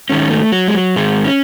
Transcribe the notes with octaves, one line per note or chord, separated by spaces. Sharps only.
G#2 D#3 C#4
A3
F#3
G#3
F#3
G#2 D#3 G#3
C#4